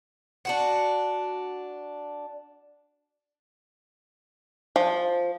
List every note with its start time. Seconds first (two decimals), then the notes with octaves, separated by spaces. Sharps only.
0.45 D4 F#4 F#5
4.76 F3